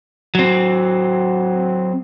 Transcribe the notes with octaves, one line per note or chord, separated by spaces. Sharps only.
F#3 C4